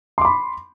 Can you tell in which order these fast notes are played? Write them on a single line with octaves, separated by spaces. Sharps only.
C6 D6 B5